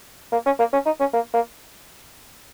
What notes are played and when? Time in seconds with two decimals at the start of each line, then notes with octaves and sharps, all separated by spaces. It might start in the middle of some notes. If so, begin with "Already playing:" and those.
0.32 A#3
0.46 C#4
0.59 A#3
0.73 C#4
0.86 D#4
1.00 C#4
1.13 A#3
1.34 A#3